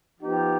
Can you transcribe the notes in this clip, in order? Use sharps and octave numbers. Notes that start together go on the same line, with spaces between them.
F3 B3 D#4 G4